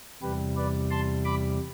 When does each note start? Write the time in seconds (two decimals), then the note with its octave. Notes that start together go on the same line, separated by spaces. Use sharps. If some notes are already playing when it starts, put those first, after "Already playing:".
0.22 E2 C3 G3 G4 B4
0.57 B4 D5
0.91 A5 C6
1.25 B5 D6